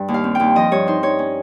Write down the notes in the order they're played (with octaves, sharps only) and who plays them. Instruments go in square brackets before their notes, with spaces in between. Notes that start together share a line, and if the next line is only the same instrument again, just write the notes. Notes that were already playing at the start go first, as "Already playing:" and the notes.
Already playing: [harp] G2 G3
D#2
F5
C4
D#2 G5
F3 D#5
G2 C#5
D#4 C5
D#4 C#5
C#4